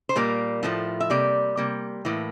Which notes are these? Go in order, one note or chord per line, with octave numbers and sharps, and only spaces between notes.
C5
A#2 G3 A#3 A#4
A2 F3 A3
E5
C3 G3 A#3 D5
C3 G3 A#3
A2 E3 A#3